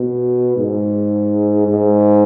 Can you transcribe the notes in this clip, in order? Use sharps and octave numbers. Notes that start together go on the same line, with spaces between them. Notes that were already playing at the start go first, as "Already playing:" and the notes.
Already playing: B2
G#2
G#2